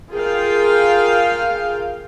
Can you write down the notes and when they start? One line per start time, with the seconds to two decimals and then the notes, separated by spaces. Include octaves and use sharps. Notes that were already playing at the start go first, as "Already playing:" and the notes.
0.11 F4 G#4 A#4 F5 G5